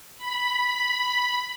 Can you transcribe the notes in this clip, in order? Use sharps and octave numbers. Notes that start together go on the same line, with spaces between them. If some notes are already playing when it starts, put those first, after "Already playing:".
B5